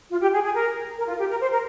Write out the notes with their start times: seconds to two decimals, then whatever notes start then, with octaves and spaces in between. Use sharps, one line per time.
0.11 F4
0.21 G4
0.33 G#4
0.43 G#4
0.54 A#4
0.98 A#4
1.08 F4
1.19 G4
1.29 A#4
1.41 C5
1.51 A#4